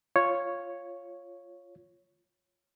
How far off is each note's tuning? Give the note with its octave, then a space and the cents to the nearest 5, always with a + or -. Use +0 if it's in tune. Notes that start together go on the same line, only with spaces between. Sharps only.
F4 +0 C#5 +0